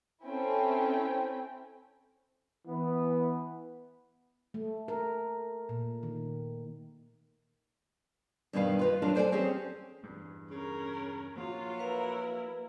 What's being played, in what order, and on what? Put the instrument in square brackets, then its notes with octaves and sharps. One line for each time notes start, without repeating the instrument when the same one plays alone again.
[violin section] C4 C#4 E4 A4 G5
[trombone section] E3 B3
[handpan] A3
A#4
A#2
D#3
[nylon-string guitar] G2 B2 D#3 G3 B4 F5
F4 B4 D#5
F#3 D4 E4 F4 A#4
A4 C5 D5 D#5 F#5 G#5
C4 C#4 G4 G#4
[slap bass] E2 G2
[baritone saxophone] C#3 [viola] C#4 A#4
[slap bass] F3 A#3 [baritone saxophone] F#3 [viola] F4
[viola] E4 A#4 [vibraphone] B4 F5